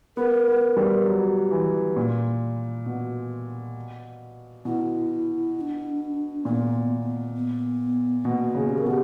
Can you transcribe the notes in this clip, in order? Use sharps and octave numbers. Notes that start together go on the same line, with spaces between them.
B3 A#4
B3
G3
F#3
E3
A#2
B2
B2 E4
E4
D4
A#2 B3
B3
B2 A#3
C#3
G4
A#4
B2 G4